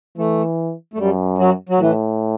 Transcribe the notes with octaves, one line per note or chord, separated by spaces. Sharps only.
E3 A3
A3
F#2 G3
F#3
F#3
A2 E3